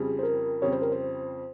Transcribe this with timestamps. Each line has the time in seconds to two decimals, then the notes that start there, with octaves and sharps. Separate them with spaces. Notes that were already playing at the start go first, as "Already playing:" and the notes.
Already playing: F2 C#3 G3 C4 G#4
0.19 C5
0.23 A#4
0.62 F2 C#3 G3 C4 C#5
0.73 C5
0.82 A#4
0.92 C5